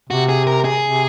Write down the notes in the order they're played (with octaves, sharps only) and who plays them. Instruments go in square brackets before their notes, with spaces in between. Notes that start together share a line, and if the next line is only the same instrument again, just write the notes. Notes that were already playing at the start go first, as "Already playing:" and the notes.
[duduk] C3 [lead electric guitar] F#4
[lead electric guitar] G#4
A#4
G#4
[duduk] C3